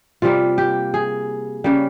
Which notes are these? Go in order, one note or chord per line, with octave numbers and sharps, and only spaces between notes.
C3 G3 A#3 F4
G4
G#4
C#3 G3 A#3